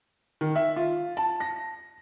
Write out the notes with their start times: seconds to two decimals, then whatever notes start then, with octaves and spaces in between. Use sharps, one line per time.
0.41 D#3
0.56 E5
0.76 F4
1.17 A5
1.40 A#6